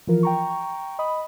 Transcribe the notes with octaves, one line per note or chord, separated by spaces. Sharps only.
E3 F3 F4 A#4
G5 A#5 C#6
D#5 B5 D#6